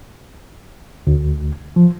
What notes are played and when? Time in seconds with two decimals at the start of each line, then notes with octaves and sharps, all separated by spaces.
1.07 D2
1.76 F3